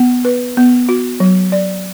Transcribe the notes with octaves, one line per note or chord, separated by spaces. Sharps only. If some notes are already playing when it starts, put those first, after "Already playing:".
Already playing: B3
B4
B3
F#4
F#3
D5